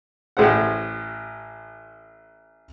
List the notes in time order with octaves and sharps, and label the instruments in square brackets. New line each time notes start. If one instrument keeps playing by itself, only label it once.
[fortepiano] A1 A2 G4 C5 F#5